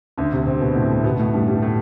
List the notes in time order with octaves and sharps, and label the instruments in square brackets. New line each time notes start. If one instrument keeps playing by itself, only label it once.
[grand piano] D2 D3
C3 C4
C3 C4
B2 B3
A2 A3
A2 A3
B2 B3
A2 A3
G2 G3
G2 G3
A2 A3